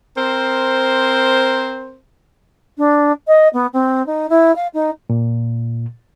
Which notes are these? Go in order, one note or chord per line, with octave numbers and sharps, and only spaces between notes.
C4 A#4 C5
D4
D#5
B3
C4
D#4
E4
F5
D#4
A#2